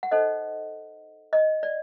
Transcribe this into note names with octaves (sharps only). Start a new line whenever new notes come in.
F#5
D#4 A4 C5 D#5
D#5
D5